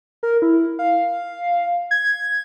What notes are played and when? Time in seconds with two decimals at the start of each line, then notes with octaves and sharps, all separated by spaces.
0.23 A#4
0.42 E4
0.79 F5
1.91 G#6